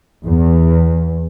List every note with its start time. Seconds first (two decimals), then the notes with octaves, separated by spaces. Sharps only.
0.24 E2